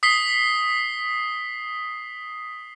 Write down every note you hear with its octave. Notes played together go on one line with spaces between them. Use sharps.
D#6 B6 C7 G7